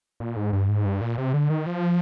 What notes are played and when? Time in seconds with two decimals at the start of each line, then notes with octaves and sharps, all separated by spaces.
0.20 A#2
0.36 G#2
0.53 G2
0.69 G#2
0.85 G2
1.01 A#2
1.18 C3
1.34 D3
1.50 D#3
1.66 F3